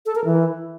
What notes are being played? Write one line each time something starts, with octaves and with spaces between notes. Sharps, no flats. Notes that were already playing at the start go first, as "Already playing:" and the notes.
A4
A#4
E3